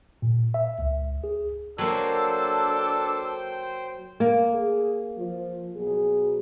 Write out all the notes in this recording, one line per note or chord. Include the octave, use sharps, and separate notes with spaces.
A#2
E5
C#2
G#4
F#3 A#3 D4 A4 C5 G5
A#3
G#4
F3
B2 F#3 G#4